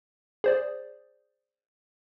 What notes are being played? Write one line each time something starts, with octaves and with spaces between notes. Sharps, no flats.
G#4 C5 D5